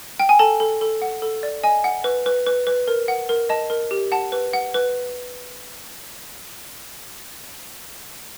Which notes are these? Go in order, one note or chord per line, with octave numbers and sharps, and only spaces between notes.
G5
G#5
A4 A5
A4
A4
F#5
A4
D5
D#5 G#5
F#5
B4
B4
B4
B4
A#4
F#5
A#4
D#5 A5
A#4
G4
F#5 A5
B4
F#5
B4